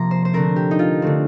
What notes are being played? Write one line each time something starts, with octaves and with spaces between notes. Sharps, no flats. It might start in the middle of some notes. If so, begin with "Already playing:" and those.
Already playing: C3 F3 A#3 A#5 C6
C5
C5
D3 A3 C4 A#4
G4
D#4
F4
D3 A3 C4